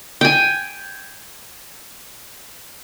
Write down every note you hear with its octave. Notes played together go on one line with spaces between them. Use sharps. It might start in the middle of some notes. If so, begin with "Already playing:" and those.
G5 G#5